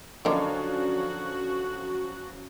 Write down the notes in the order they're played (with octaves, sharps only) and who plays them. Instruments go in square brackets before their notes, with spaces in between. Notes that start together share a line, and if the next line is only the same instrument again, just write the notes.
[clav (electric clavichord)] D3 [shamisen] D#3 A#3 [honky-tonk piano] F3 F#3 C#4 [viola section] F#4